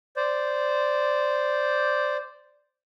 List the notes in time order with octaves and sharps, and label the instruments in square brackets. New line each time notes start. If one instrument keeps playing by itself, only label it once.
[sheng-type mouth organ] C5 D5